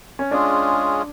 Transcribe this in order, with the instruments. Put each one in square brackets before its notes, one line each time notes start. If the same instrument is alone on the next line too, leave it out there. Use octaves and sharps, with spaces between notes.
[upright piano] C#4
[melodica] G#3 C#4 F4 G#4 [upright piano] D4